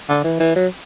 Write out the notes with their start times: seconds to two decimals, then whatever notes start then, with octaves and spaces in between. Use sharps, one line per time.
0.09 D3
0.24 E3
0.40 E3
0.56 F#3